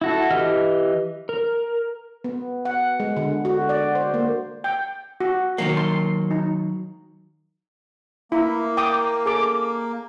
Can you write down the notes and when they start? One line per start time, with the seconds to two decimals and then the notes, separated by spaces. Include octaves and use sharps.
0.01 E4 F#4 A4
0.31 E3 G4 D#5 F6
1.29 A#4
2.24 B3
2.65 F#5
3.00 G#3
3.16 D3
3.45 F#4
3.69 D5
3.95 C5
4.14 A#3
4.64 G5
5.21 F#4
5.58 D#3 F#3 A#3
5.76 A5 C6
6.31 D#4
8.32 A#3 E4
8.77 G5 D6 D#6
9.26 G#4 A4 D6